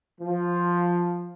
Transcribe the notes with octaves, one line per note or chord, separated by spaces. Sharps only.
F3